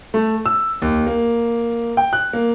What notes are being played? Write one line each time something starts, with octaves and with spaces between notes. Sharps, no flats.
A3
E6
D#2
A#3
G5
F#6
A#3